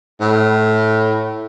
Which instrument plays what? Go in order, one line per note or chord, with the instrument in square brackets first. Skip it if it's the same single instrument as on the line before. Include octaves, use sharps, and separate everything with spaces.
[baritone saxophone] A2